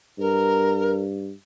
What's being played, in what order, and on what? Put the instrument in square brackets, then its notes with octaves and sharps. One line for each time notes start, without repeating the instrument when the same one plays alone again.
[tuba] G2 [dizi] A#4